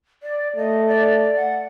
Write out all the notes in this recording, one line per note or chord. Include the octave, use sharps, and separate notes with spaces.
D5
A3 D#5
D5
F#5